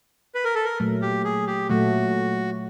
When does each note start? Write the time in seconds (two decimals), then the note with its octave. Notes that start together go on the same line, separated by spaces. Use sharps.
0.35 B4
0.45 A#4
0.55 A4
0.65 A#4
0.80 A#2 F#3 A3
1.02 G4
1.25 G#4
1.47 G4
1.69 A#2 F#3 A3 F#4